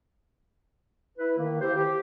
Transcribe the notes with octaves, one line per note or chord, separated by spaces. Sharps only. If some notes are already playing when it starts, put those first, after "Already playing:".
E4 B4
D#3 A#3
E4 G4 C5
G4